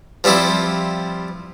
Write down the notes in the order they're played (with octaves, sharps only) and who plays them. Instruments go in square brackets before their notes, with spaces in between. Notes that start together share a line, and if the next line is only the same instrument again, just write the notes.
[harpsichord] F3 G3 C4 E4 F4